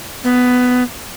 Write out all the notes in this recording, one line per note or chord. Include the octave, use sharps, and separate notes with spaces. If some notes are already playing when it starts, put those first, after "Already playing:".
B3